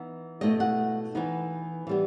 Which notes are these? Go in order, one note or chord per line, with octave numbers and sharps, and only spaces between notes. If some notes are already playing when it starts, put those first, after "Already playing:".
Already playing: E3 B3 D#4
B2 A3 E4 D#5
F#5
E3 B3 D#4
E3 G3 B3